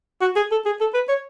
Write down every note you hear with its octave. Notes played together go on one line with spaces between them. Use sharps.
F#4
G#4
A4
G#4
A4
B4
C#5